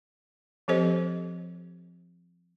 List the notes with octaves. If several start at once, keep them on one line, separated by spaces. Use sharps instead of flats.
F3 C4 G4 A4 C5 D#5